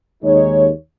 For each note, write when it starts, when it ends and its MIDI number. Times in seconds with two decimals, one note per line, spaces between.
0.24 0.69 39
0.24 0.69 56
0.24 0.69 63
0.24 0.69 73